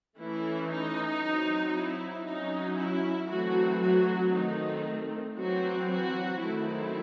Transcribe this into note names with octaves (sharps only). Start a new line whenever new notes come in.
E3 A3 C#4 E4
D#4
F#3 C4
E4
F#3 C#4 D#4
E4
E3 F#3 A3 C4 F#4
F#3 F#4
D#3 A3 C4 D#4
E3 F#3 C4 F#4
F#3 F#4
D#3 F#3 A3 C4 E4